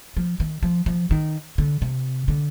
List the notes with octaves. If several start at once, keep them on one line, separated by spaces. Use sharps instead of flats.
F3
D#3
F3
F3
D#3
D3
C3
D3